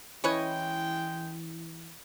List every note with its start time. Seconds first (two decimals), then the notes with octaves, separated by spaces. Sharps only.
0.24 E3 G#3 C#4 E4 B4 C#5 D#5 G5